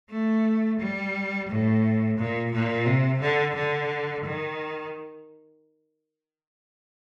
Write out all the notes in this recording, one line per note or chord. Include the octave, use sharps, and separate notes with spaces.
A3
G3
A2
A#2
A#2
C3
D3
D3
D#3